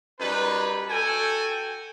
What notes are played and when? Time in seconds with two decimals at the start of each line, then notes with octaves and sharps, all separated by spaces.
0.19 F#2 G3 D#4 B4
0.89 F#4 A4 G5 G#5